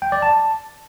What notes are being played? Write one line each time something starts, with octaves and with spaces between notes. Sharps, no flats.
G5
D5
A5